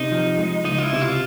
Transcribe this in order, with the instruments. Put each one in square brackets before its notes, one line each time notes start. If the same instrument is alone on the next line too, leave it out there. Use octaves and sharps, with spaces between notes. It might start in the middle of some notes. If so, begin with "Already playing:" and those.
Already playing: [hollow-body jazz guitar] C3 [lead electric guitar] D#4
[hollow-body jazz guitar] F3
G#3
[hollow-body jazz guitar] C#2 [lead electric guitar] D#4
[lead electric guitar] F4
E4
[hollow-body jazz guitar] C3
[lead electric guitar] F4